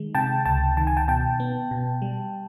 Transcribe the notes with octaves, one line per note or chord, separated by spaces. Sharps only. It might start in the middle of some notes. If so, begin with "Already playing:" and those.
Already playing: D#3 G#3
C3 G5 A5
C#2 G5 A5
D#3 A5
G#5
G5 A5
B2 G5 A5
B3
B2
G3